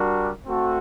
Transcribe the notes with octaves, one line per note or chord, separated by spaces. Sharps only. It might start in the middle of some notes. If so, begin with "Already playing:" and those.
Already playing: G3 D4 F#4 A#4
A3 C4 F#4 A4